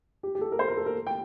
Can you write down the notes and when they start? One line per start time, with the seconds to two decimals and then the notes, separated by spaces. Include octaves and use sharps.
0.23 G4
0.35 G4
0.41 A4
0.52 A#4
0.59 C5
0.68 A#4
0.77 A4
0.86 A#4
1.07 G5